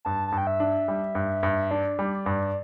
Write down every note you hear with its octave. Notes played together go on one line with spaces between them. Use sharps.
G2 A5
G2 A5
G5
E5
D4
G3
G2
G2
D4 D5
G3
G2